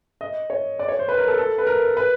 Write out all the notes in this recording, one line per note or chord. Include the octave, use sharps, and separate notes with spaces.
D#5
C#5
D5
C#5
C5
B4
A#4
A4
A4
B4
A#4
B4